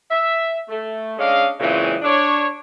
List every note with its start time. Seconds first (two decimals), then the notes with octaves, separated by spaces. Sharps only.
0.11 E5
0.69 A3
1.19 G#3 C#4 D4 D#5 F5
1.60 A#2 C#3 E3 F#3 G#3 C4
2.02 D4 C#5